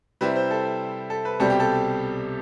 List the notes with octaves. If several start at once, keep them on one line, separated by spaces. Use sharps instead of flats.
C3 G3 C4 E4 B4
C5
A4
A4
B4
C2 B2 G3 C4 A4
G4
A4